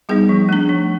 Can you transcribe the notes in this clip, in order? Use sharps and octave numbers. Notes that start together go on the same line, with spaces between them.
G3 B3 D#4 G#4
F3
A3 D4
F3